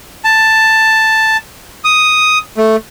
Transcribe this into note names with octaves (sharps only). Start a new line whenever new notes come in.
A5
D#6
A3